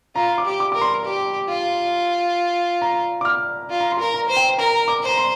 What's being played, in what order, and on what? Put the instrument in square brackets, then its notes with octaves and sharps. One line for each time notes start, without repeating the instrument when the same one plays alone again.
[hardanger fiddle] F4 [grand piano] A#5
[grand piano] D6
[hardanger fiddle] G4
[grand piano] D6
[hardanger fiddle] A#4 [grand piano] D6
[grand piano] C6
[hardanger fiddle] G4
F4
[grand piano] A#5
D6
F6
[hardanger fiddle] F4
[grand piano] A#5
C6
[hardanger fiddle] A#4
[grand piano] A#5
[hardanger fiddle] C5
[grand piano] G5
[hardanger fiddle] A#4 [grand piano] A#5
[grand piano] D6
[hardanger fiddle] C5
[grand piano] A#5
C6